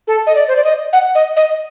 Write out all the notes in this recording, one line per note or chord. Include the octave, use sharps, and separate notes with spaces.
A4
D#5
D5
C5
D5
D#5
F#5
D#5
D#5